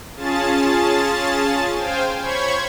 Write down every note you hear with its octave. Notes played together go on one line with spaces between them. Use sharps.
C#4 F4 G#4 A5 A6
C5 F5 G5 G#5
C5 C#5 B5 C#6 G#6